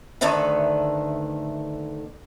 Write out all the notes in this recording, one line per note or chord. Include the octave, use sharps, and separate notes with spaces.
D2 D3 D#3 A3 B4 E5